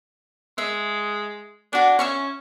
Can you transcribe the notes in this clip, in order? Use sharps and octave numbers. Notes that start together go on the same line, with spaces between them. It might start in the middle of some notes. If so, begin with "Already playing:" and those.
G#3 E5
D4 F#4 G#5
C#4 E5 G#5 C#6